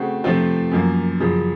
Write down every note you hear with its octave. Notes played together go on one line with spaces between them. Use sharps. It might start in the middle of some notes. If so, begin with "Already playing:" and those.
Already playing: C#3 A3 C4 F#4
C3 F3 A3 C4 F4
F#2 F3 A#3
F#2 C#3 F3